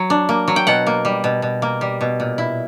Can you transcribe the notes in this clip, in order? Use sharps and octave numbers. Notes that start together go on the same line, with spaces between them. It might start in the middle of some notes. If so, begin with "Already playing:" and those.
Already playing: F#3
D4
A#3
F#3
G5
B2 F#5
A#3
G3
B2
B2
A#3
G3
B2
A#2
E4